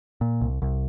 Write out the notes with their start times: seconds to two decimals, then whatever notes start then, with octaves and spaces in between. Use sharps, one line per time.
0.21 A#2
0.41 C2
0.62 C2